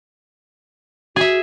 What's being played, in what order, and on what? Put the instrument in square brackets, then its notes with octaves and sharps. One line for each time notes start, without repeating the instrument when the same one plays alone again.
[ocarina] F#4 [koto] G#4 E5